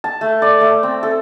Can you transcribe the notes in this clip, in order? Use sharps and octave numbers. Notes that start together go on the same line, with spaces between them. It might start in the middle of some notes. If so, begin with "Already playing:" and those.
A5
A3
D5
A3
C4
A4